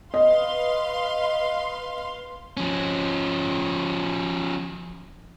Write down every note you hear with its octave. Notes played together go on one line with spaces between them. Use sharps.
B4 D#5 F5 C6
F3 C#4